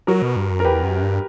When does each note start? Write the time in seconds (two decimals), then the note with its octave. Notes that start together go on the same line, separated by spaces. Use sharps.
0.07 F#3 F#4 A#4
0.22 B2
0.36 G2
0.51 F#2
0.60 A#4
0.65 E2 G4 B4
0.83 F#2
1.02 G2